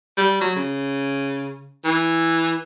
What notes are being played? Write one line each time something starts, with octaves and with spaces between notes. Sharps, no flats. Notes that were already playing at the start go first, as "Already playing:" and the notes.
G3
F#3
C#3
E3